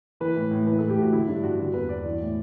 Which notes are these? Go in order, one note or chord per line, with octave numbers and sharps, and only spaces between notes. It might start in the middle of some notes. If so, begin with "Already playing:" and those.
E3 B4
A2
A2
E3 B4
A4
A2
G4
A2 F#4
D3 E4
G2 D4
G2 F#4
D3 F#4
E2 B4
E2 D5
E3
A2